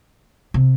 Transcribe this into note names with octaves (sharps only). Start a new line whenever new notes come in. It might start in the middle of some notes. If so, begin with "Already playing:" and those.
C3